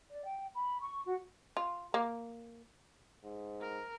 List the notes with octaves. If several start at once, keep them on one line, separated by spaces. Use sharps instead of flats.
D5
G5
B5
C#6
F#4
F4
A#3
G#2
A#4